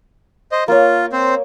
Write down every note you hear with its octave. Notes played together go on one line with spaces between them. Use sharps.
C5 D#5
A#3 F4 C#5
C4 C5